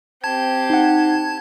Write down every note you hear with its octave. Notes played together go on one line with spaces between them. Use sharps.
C4 G4 A5 G#6
D#4 F#5